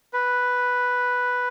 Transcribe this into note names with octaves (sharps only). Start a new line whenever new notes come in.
B4